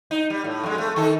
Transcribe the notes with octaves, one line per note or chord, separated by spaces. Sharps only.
D#4
G3
A2
F2 G#3
A3
D#3 A4